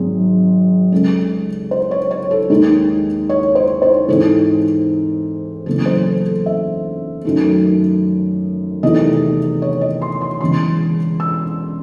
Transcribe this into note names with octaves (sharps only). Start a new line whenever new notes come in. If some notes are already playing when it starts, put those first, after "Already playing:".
Already playing: G#1 G#2 F#3 C4 G#4
C#2 C#3 G#3 C#4 A4
C5
C#5
C#5
A4
D#2 D#3 G#3 D#4
C#5
C5
C5
G#2 E3 C4 A4
F#1 E2 C#3 A4
C5
A4
A4
E5
F#2 D#3 A3
E2 C3 D#3 A3 D#5
C#5
D#5
C6
C6
E1 E2 C#3 E3 C6
E6